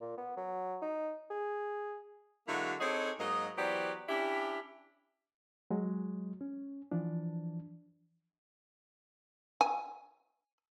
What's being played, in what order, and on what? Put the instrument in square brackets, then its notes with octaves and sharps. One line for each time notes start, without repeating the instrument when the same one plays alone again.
[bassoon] A#2
B3
F#3
D#4
G#4
[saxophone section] D3 F#3 G#3 A#3 E4 F#4
C4 D4 D#4 G#4 A4 C#5
G#2 F#3 A#3 D#5
E3 F#3 B3 G4 C5 D5
C#4 D4 E4 G4
[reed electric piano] F#3 G#3
C#4
E3 F3 D4
[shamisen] G#5